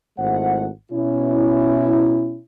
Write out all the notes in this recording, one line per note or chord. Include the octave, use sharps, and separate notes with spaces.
G#1 G#3 A3 E4 C5 F#5
B2 C#4 E4